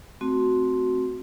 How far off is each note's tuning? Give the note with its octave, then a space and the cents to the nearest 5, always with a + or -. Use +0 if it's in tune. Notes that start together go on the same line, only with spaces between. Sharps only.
A3 +0 C4 +0 F#4 +0